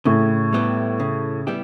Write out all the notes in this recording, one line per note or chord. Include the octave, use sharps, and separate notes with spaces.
A2 C#3
G3 B3 E4 G4
C#3
G3 B3 E4 G4